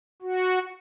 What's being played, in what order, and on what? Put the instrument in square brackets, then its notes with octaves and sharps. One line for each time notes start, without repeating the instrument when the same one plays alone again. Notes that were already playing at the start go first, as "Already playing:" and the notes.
[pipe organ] F#4